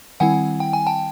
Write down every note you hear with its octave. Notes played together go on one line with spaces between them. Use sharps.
D#3 G3 C4 E4 F#5 G#5
G5
G#5
G5 A5